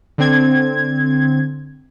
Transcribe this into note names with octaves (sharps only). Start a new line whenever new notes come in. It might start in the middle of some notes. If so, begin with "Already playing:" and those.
D3 C4 G#6